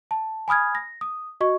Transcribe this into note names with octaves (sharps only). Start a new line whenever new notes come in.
A5
G#5 B5 D#6 F6 G#6
A#6
D#6
F#4 D#5 C#6